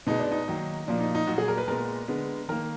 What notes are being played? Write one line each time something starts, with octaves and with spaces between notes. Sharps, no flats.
B2 G#3 B3 D#4
D4
D#4
D#3 F#3 A#3
A#2 F3 A#3 D4
D#4
D#4
A#2 F#3 A#3 F#4
G#4
A#4
B4
A#2 G#3 B3 A#4
D3 G#3 B3
D#3 A#3 A#4